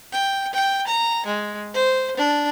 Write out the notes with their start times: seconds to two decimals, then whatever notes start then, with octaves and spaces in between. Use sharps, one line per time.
0.12 G5
0.53 G5
0.87 A#5
1.26 G#3
1.74 C5
2.17 D4